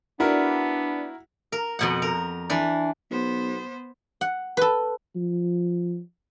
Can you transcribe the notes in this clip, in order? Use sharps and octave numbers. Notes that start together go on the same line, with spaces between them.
B3 D4 E4 F#4 A#4
A#4
F2 B2 F#5
A#4
E3 D4
B1 B3 C5
F#5
A4 B4
F3